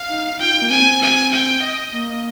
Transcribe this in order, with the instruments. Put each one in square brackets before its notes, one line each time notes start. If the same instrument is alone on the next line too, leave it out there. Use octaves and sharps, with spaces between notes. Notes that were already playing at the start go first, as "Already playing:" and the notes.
Already playing: [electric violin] F5
[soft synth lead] D#4
[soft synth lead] F4 [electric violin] G5
[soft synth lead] D#4
A#3
[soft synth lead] C4 [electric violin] G#5
[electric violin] G#5
G5
D#5
[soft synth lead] A#3